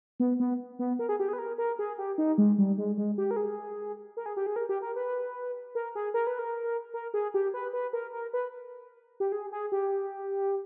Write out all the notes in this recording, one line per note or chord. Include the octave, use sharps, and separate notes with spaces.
B3
B3
B3
A#4
G#4
G4
G#4
B4
A#4
A#4
G#4
G4
D#4
G#3
G3
G#3
G#3
G4
A#4
G#4
A#4
G#4
G4
G#4
A#4
G4
A#4
B4
A#4
G#4
A#4
B4
A#4
A#4
G#4
G4
B4
B4
A#4
A#4
B4
G4
G#4
G#4
G4